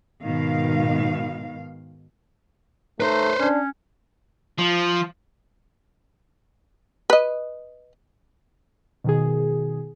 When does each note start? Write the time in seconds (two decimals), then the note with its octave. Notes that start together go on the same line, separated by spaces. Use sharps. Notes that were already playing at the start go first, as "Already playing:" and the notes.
0.24 G#2 B2 D#3 F5
3.00 A3 D#4 B4 C5
3.40 C#4 D4
4.58 F3
7.10 B4 D#5
9.04 B2 D#3 G#4